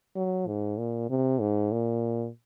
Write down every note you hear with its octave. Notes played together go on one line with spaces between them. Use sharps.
F#3
G#2
A#2
C3
G#2
A#2